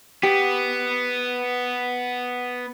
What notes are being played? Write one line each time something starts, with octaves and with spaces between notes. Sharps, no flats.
B3 G4